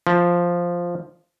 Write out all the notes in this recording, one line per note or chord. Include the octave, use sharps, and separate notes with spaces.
F3